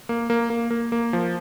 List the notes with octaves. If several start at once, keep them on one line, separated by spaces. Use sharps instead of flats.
A#3
A#3
A#3
A#3
A#3
F3